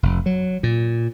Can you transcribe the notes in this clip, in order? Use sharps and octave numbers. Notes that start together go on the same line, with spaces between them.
F1
F#3
A#2